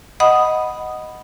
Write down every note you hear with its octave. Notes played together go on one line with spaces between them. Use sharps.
D#5 F#5 B5 D#6